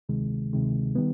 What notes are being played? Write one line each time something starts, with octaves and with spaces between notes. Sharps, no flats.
D2 C3 D#3 G#3
D2 C3 D#3 G#3
D#3 G3 B3